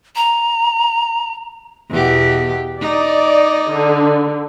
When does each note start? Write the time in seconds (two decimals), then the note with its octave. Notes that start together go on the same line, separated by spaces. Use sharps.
0.16 A#5
1.90 E2 B2 G4
2.81 D#4 D5
3.71 D3